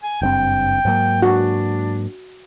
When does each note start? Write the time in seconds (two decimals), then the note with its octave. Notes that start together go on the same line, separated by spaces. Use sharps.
0.03 G#5
0.22 F#1 G2 C4 G5
0.85 G#2 F#3 A#3
1.23 D4 F#4